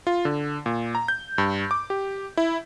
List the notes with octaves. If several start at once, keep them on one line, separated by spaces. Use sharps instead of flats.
F4
D3
A#2
A#5
G6
G2
D6
G4
E4